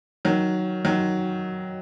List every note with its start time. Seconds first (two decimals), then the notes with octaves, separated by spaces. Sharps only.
0.25 D#3 F#3
0.85 D#3 F#3